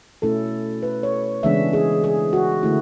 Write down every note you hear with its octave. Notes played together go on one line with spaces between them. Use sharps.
B2 A3 C#4 E4 A4
B4
C#5
C#3 E3 G#3 B3 D4 E5
G#4
G#4
F#4
D3 A3 E4